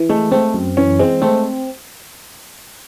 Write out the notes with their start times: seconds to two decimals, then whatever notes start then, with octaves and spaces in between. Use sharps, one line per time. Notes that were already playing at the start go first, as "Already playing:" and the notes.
Already playing: E3
0.09 G#3 A3
0.31 A3 C4
0.54 F#2
0.77 E3 C#4
0.99 G#3 C4
1.22 A3 C4